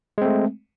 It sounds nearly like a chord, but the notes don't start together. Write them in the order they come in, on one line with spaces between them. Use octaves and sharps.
G#3 C4 A3